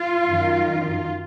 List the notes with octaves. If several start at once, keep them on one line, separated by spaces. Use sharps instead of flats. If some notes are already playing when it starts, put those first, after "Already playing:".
Already playing: F4
F#2 D#3